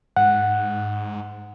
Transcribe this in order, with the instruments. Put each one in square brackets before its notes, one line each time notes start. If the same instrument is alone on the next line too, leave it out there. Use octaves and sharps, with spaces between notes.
[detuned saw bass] G#2 [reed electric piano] F#5